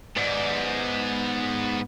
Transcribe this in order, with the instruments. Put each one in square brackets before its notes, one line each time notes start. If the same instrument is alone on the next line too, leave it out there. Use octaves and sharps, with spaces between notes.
[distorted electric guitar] G#2 [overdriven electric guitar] B3 D5